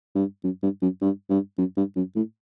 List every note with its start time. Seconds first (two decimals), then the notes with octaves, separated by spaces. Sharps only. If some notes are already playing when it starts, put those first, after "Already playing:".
0.15 G2
0.44 F#2
0.63 G2
0.82 F#2
1.01 G2
1.29 G2
1.58 F#2
1.77 G2
1.96 F#2
2.16 A2